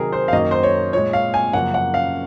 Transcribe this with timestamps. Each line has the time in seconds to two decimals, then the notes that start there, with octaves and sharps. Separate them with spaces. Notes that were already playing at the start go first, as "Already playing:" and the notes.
Already playing: C3 D#3 F#3 G#4 A#4
0.13 C5
0.28 F5
0.33 F#2 D#3 F#3 A#3 D#5
0.51 C5
0.63 C#5
0.93 A#2 G#3 C#5
1.13 F5
1.34 G#5
1.53 F#2 C#3 F3 A#3 F#5
1.74 F#5
1.94 F5